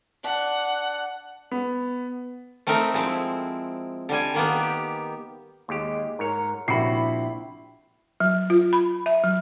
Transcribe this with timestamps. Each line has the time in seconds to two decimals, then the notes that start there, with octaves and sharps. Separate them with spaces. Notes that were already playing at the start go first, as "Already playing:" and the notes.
0.24 D4 F#5
1.52 B3
2.67 A3 C4 D#4 A#4 E5
2.94 F3 G#3 C4 E4
4.09 D3 G3 G#5
4.34 D#3 A#3 B3
4.61 G4
5.69 D#2 G#3 G4
6.19 G#2 A#4 C#5
6.68 A#1 C3 E4 F#4 B5 C7
8.20 F#3
8.50 F4
8.73 B5
9.06 E5
9.24 F#3